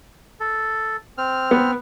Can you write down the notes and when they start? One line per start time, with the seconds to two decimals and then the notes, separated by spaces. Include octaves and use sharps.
0.40 A4
1.18 C4 F6
1.51 B3